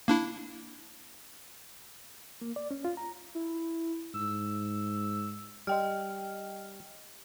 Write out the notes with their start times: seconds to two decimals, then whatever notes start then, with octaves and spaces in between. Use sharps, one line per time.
0.08 A#3 D4 E4
2.42 A#3
2.56 D5
2.71 C#4
2.85 F4
2.97 A#5
3.35 E4
4.14 G#2 E6
5.67 G3 D#5 G5 F6